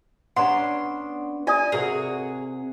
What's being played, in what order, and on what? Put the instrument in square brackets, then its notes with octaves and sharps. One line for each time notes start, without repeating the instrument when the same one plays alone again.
[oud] B3 C#4 D4 [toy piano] F#5 A#5 [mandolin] C6
[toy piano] F4 D5 D#6 [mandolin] G#5
[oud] C3 F#4 A#4 [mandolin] G#4